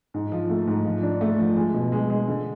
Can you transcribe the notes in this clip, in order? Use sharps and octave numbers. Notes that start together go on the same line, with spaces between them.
G#2
F3
A3
G#2
F3
D4
A3
F3
G#3
B2
G#3
G#3
D3